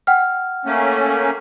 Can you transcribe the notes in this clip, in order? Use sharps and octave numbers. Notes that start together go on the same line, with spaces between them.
F#5 G5 F6
A3 A#3 C#4